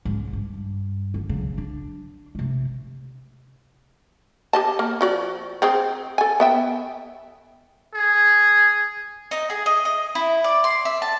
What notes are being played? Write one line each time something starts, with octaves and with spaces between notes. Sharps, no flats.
G#2 C#3
G2
D3
C#3 F#3
D4
C3 A3
G4 D#5 A5
A#3
F3 F#4 D5
C4 G#4 C5
A4 G#5
B3 E5 G5
G#4
D#4
G#4
D#5
D#5
E4
D5
C6
E5
A5